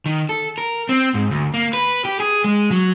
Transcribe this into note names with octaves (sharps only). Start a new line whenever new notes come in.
D#3
A4
A#4
C4
G#2
D2
A#3
B4
G4
G#4
G#3
F#3